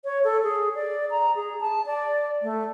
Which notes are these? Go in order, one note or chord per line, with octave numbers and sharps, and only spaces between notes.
C#5
A4
G#4
D5
A#5
G#4
A5
D5
A3